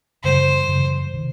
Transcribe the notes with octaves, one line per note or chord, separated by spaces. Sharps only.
F#2 C#3 E3 G3 C5
F#2 C#3 E3 G3
C3 D#3